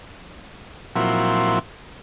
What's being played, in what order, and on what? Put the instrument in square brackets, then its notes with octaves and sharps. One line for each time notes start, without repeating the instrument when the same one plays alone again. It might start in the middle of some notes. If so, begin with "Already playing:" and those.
[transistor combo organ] A#2 F3 F#3 C4 E4